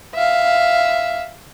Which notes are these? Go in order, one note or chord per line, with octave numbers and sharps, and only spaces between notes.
E5 F5